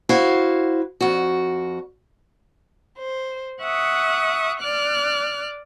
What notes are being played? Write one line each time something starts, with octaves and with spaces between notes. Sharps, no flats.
E4 F#4 C5 F5
F2 F#4
C5
E5 F#5 C#6 D#6
D5 F6 F#6